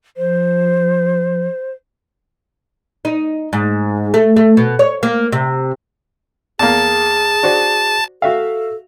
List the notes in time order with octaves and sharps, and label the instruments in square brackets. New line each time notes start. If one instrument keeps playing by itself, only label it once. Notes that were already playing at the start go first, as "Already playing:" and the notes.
[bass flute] F3 [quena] C5
[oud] D#4
G#2
A3
A3
B2
C#5
A#3
C3
[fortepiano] E2 A#3 [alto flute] G#4 [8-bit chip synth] A5
[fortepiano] D4 F#4 C5
[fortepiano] F#4 E5 F5 [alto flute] A4